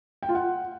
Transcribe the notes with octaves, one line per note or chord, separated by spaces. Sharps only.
G5
F4
F#5